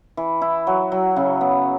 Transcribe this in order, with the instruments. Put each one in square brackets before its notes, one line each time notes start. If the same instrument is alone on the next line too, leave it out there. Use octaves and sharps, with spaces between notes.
[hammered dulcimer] E3
E4
F#3
F#3
C#3
B3